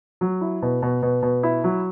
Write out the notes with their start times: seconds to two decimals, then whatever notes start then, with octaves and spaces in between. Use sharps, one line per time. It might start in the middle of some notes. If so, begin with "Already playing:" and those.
0.21 F#3
0.41 E4
0.62 B2
0.82 B2
1.03 B2
1.23 B2
1.43 E4
1.64 F#3